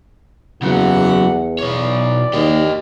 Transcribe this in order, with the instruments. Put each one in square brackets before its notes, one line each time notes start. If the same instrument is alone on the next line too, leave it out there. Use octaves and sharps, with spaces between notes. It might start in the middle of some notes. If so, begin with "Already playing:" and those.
[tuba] E2 [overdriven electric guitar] C#3 F#3 [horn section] G4 A4 F#5
[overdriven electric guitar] B2 C#5 [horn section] E3 D5
[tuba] D#2 [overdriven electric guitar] G4 D#5